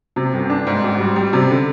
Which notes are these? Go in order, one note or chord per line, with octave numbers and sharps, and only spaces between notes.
C3
G1
D4
G#2
G#1
G3
G3
C3
D3